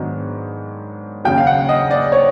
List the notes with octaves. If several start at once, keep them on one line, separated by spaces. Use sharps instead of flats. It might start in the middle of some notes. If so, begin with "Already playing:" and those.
Already playing: G#2 D#3 F#3 B3 D4
D#2 C#3 F#3 G5
F5
F#5
D#5
D5
C#5